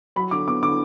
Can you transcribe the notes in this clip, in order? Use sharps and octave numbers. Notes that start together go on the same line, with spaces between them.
F#3 B5
D3 D6
B3 D6
D3 D6